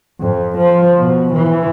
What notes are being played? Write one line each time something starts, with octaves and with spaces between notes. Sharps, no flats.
F2
F3
B2
E3